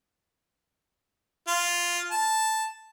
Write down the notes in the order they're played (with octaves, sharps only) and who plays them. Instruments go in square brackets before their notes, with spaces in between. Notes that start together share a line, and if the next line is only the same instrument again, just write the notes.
[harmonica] F4
A5